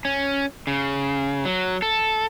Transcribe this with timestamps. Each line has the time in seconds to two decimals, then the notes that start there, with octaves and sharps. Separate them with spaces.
0.05 C#4
0.67 C#3
1.45 F#3
1.82 A4